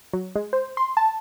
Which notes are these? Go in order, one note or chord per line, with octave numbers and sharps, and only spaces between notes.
F#3
G#3
C5
C6
A5